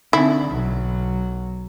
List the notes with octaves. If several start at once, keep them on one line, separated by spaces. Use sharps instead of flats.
D3 C4 D#4 E4
B1 F#3